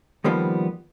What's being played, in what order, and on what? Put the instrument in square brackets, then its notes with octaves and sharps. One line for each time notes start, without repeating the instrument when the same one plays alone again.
[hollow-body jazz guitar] D#3 F3 G3 A#3 B3